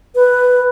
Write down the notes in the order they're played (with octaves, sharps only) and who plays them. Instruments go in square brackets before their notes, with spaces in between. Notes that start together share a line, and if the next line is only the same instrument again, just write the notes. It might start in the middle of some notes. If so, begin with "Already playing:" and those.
[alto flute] B4